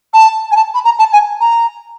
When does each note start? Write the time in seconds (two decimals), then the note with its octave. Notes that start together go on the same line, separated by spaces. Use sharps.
0.14 A5
0.51 G#5
0.56 A5
0.74 B5
0.85 A#5
0.99 A5
1.13 G#5
1.40 A#5